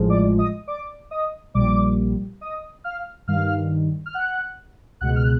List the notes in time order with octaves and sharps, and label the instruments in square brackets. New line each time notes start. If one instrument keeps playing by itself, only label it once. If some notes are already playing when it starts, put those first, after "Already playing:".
Already playing: [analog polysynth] A1 A2 F3 G#3
D5 D6
D#5 D#6
D5 D6
D#5 D#6
A#1 A#2 G3 D5 D6
D#5 D#6
F5 F6
G2 D#3 G3 F5 F6
F6
F#5 F#6
C#2 B2 G#3 F#5 F#6
F6
F#6